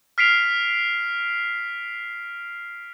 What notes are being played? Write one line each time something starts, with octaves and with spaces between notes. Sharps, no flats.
F6 B6 C7 D7 F7